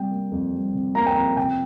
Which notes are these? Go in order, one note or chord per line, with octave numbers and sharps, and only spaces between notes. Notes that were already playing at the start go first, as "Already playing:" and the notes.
Already playing: C3 G3 G5
A#3
F2
G3
C3
A#3 A#5
G5
F2 A#5
C3 G5